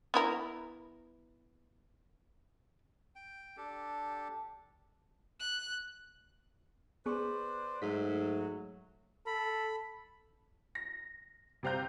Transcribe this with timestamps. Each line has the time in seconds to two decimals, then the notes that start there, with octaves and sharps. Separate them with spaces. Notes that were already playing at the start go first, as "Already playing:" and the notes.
0.14 B3 E4 A#4
3.16 G5
3.57 D4 G4 A4
5.40 F#6
7.06 B3 G#4 B4 C5 D5 C#6
7.82 G#2 F#3 A3 B6
9.27 A4 B5
10.75 A#6
11.63 C3 G3 C4 F5 A#5 G6